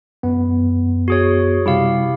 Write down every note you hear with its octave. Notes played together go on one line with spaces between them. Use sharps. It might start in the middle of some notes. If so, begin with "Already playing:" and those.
F#2 B3
F#4 G#4 C#5
C3 G3 E4 G4 F5